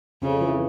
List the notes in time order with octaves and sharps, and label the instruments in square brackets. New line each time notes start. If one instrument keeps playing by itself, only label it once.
[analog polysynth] F2 [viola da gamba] C#3
[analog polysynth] E3